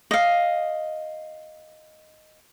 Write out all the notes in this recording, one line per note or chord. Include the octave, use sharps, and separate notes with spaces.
D#5 F5